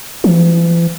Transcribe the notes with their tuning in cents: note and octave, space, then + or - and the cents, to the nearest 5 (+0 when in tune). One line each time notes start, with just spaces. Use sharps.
E3 +45